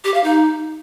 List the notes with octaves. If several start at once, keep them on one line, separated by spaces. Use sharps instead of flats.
G4
F5
D#4